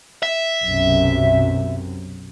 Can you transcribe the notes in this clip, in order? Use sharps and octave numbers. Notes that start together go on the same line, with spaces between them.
E5
B1 F#2 C3